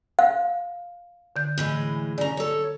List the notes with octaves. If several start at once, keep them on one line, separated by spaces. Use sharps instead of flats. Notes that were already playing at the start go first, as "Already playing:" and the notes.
F5
D3 G6
A2 E3 G#3
C#3 D5 A#5
A4 C#5